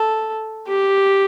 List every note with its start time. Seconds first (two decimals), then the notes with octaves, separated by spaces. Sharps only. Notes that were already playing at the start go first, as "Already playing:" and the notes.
Already playing: A4
0.67 G4